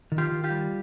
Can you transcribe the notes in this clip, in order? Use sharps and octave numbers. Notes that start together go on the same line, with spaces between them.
D#3
F4 G4
D#3
F4 G4
G3